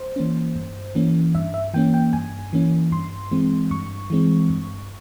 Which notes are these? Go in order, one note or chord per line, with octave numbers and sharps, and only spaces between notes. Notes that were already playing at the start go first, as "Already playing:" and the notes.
Already playing: C5
E3 A#3 C#4
G2
E3 A#3 C#4
G2 E5
E5
E3 A#3 C#4 G5
G5
G2 G#5
E3 A#3 C#4
G2 C6
E3 G#3 C4
G2 C#6
E3 G#3 C4
G2